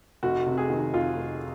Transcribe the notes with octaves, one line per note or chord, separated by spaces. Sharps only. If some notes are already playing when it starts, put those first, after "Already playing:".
F1 F#4
C3
G#4
D#3
F2 F4
F1